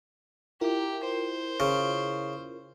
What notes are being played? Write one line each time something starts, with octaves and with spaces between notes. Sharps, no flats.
E4 F4 G4 A#4
C5
C#3